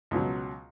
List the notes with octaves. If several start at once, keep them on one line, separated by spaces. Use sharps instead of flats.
C#2 B2 F#3